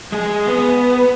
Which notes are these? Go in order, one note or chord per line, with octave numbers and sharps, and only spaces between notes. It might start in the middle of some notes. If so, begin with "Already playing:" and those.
G#3 G#4
B3